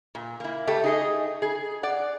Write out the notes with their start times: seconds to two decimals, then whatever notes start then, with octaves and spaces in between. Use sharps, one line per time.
0.15 A#2
0.40 A#3 E4
0.67 A3 G4
0.84 D#4 G#4 D#5
1.42 G#4
1.83 D5 F#5